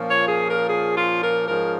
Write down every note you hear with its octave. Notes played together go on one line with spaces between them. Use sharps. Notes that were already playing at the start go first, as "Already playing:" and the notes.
Already playing: A#2 F3 A#3 C#4
C#5
G#4
A#4
G#4
F4
A#4
G#2 F3 G#3 C#4 A#4